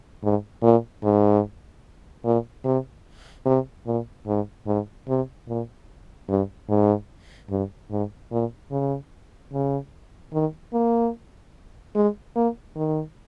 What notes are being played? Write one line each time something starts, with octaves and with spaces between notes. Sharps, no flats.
G#2
A#2
G#2
A#2
C3
C3
A#2
G#2
G#2
C3
A#2
G2
G#2
G2
G#2
A#2
C#3
C#3
D#3
A#3
G#3
A#3
D#3